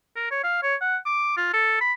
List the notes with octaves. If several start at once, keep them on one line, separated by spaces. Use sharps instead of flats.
A#4
C#5
F5
C#5
F#5
D6
F4
A4
B5